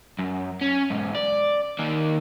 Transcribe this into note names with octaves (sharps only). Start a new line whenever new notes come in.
F#2
C#4
B1 G#2
D5
D#3 A#3